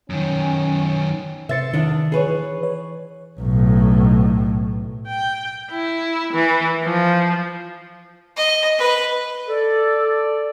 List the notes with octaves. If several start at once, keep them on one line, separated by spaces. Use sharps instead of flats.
F#2 D#3 C#4
C3 C5 E5 A6 C#7
E2 D#3 D4
G#4 B4 C#5
E3
C#5
B1 A2
G5
E4
E3
F3
D#5
B4
A4 D5